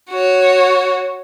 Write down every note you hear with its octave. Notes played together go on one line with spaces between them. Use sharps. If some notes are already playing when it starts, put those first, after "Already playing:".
F#4 C#5